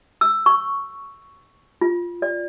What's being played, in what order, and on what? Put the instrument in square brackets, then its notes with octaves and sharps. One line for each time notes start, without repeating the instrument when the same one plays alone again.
[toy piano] E6
C#6
F4
D5